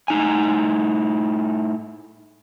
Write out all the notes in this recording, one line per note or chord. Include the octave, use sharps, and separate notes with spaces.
A2 D#4 G#5